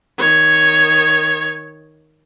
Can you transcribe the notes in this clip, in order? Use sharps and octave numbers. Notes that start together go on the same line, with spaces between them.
D#3 C#5